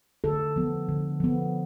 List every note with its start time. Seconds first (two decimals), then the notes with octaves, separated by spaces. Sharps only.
0.24 D3 A4
0.56 F3 B3
0.89 D3
1.20 F3 B3